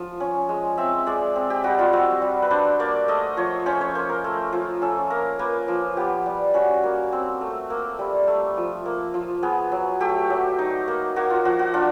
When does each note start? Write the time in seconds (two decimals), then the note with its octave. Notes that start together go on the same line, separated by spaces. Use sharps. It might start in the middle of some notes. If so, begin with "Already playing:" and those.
Already playing: F3
0.20 C#4
0.49 G#3
0.77 C4 E5
1.06 G#3 D5
1.36 C4
1.50 G4
1.64 G3 F#4
1.79 F4
1.93 C4 F#4
2.22 G3
2.42 B4
2.50 D4 C5
2.79 A#3 D5
3.08 A3 D#5
3.37 F3 C#5
3.66 C#4 C5
3.81 C#5
3.95 A#3 C5
4.09 A#4
4.24 A3
4.53 F3
4.82 C#4 A4
5.10 A#3 A#4
5.39 A#3 B4
5.68 F3
5.97 B3 G4
6.26 G3
6.54 C#4 F#4
6.83 A#3
7.12 C4
7.41 A3
7.70 A#3
7.99 G3
8.27 A3
8.57 F3
8.86 A#3
9.14 F3
9.43 B3 G#4
9.72 F#3
10.00 A3 G4
10.30 F#3
10.59 D#4
10.88 A#3
11.16 A#3 F#4
11.30 F4
11.45 F3 F#4
11.59 F#4
11.74 D4 F4